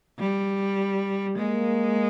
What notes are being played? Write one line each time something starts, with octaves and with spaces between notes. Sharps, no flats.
G3
G#3 A#3